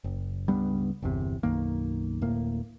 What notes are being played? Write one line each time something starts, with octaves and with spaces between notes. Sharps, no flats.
F#1
C#2 G2 G3 B3
G1 E2 C3
B1 F#2 D#3 A#3
D1 A2 A#3